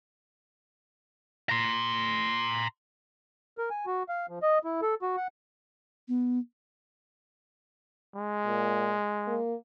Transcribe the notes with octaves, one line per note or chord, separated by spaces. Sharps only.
A#5 C6
A#4
G#5
F#4
F5
F3
D#5
E4
A4
F#4
F#5
B3
G#3
A#2
A#3